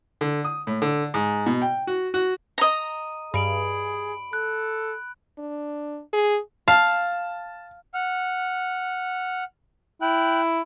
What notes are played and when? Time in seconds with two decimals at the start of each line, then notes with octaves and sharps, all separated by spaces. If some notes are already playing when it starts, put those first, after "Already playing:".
0.21 D3
0.44 D#6
0.67 A2
0.82 D3
1.14 G#2
1.46 B2
1.62 G5
1.87 F#4
2.14 F#4
2.58 D#5 A#5
3.34 G2 G#4 B5 D7 F#7
4.33 A4 F#6
5.38 D4
6.13 G#4
6.68 F5 A5
7.94 F#5 F6
10.02 E4 G5 F#6